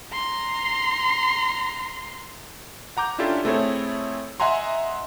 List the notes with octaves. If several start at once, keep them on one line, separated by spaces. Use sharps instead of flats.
A#5 C6
F#5 A#5 D6 G6
C#4 D4 E4 F4 G4 A4
A3 C4 E4 G#4 A4 C#5
D#5 E5 F#5 G#5 A#5 C6